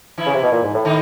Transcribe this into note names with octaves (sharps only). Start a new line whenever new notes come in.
E3 E4
C#3
C3
B2
A#2
G#2
A2
A2 D#3 D#4